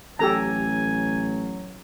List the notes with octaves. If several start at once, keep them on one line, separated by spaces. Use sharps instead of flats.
A1 F#3 G4 A4 G#5 A#5